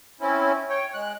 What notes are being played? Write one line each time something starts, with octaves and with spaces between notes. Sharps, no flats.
C4 C#4 E4
C#5 G5
G#3 F#6